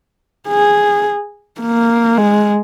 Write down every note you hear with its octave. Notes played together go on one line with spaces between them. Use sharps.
G#4
A#3
G#3